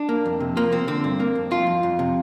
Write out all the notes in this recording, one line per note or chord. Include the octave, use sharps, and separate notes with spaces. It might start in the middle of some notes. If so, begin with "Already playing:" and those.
Already playing: D4
A#3
F2
C3
F3 A#3
F3 C4
D3 C4
G2
A#3
F2
F2 F4
F2
F2
C3